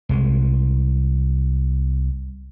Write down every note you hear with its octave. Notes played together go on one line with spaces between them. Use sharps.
C2 G#3